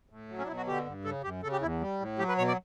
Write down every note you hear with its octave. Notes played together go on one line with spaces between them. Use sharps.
A2
F#3
C#4
D4
B2 E4
F#4
D3 G4
G2
C#3 A4
F#2 G4
C#3 A4
G4
E2 E4
G3
A2
F#3 G4
B4
B2 C#5
D5